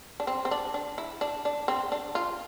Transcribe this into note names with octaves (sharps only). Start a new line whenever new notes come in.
D4
C4
C4
D4
D4
E4
D4
D4
C4
D4
F4